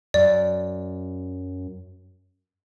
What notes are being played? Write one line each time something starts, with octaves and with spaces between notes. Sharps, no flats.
F#2 D5